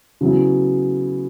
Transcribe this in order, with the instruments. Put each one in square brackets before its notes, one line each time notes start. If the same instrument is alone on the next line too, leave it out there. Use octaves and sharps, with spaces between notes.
[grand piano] C#3 F#3 B3 E4